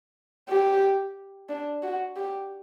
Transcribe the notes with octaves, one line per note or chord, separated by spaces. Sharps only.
G4
D4
F#4
G4